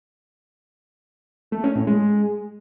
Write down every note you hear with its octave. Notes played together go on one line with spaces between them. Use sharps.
A3
C#4
A2
G#3